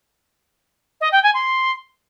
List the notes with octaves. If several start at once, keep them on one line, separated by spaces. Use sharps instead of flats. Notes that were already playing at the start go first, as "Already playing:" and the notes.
D#5
G5
G#5
C6